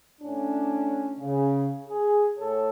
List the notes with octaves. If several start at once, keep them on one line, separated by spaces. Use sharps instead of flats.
A2 C#4 D4
C#3
G#4
A2 A4 C#5